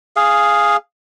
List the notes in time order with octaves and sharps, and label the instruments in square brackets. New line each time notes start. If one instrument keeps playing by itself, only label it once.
[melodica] G#4 F5